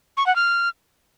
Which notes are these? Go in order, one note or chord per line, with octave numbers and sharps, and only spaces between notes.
C#6
F#5
F6